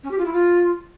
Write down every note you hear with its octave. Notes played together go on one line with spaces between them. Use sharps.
C#4
G4
F4
E4
F4